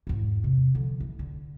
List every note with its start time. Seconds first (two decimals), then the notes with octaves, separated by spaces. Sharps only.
0.07 E2 G#2
0.44 C3
0.75 D3 F3
1.00 E3
1.19 D3